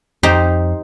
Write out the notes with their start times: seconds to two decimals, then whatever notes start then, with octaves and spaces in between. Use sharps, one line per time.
0.23 F2 D#4 G4 C5